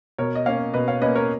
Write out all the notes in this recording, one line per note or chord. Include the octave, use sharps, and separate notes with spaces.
B2 A#4 C#5
D#5
A#3 C#4 C#5 F5
B2 B4 D#5
C#5 F5
A#3 C#4 B4 D#5
A#4 C#5